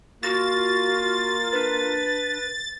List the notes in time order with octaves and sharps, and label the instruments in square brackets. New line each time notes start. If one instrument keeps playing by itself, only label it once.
[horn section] A#3 F4 [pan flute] F#4 [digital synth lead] A6
[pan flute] D4 [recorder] B4